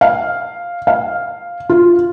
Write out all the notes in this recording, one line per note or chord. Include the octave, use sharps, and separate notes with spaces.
F5
F5
F4